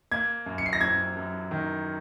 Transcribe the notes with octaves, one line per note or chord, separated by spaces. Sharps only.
A#3 G#6
F#2
C#7
C7
A#6
F#2 G#6
F#2
D#3